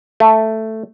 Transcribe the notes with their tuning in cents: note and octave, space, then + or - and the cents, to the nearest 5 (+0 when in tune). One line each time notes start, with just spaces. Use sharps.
A3 +5